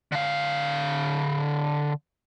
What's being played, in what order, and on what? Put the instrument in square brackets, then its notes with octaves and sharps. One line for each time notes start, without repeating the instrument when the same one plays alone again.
[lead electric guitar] D3 F5